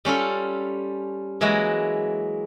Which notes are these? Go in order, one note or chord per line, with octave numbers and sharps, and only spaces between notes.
G3 C#4 F4 A4
E3 F#3 G#3 A#3 E4 F#4